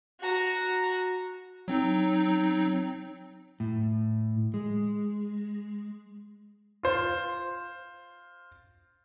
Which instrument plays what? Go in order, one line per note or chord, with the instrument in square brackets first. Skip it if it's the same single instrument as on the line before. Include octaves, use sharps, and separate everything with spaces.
[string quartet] F#4 A#5
[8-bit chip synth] F#3 C4 D#4
[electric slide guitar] A2
G#3
[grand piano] F4 C5